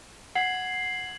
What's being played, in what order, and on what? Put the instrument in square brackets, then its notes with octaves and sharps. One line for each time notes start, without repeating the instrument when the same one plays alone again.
[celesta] F#5 [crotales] G#6 C7 F#7